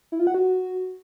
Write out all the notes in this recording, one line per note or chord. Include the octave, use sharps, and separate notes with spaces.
E4
F4
F#5
F#4